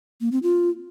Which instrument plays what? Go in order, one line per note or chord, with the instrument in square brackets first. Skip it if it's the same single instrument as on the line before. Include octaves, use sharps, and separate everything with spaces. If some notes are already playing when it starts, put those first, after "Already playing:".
[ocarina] A#3
C4
F4